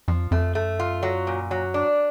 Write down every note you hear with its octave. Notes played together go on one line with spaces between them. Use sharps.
F2 F3
F2 A3
F#2 A3
F4
F#3
A#2
F#3
D4